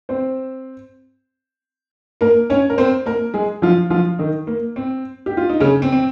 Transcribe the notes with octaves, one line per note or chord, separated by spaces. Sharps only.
C4 C5
A#3 A#4
C#4 C#5
A#4
C4 C5
A#3 A#4
G#3 G#4
F3 F4
F3 F4
D#3 D#4
A#3
C4
G4
F4
D#4
C#3 C#4
C4
C4